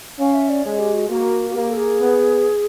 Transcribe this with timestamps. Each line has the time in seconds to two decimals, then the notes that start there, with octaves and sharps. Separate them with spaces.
0.19 C#4 F5
0.34 E5
0.49 D5
0.65 G#3 C#5
0.79 G4
0.94 F#4
1.09 A#3 F#4
1.50 F#4
1.54 A#3 G4
1.70 A4
1.77 G#4
2.00 B3